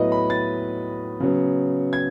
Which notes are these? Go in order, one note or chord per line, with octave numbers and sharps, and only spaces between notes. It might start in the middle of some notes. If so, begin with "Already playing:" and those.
Already playing: A2 F#3 B3 B4 D#5
B5
A6
C#3 F#3 B3
G#6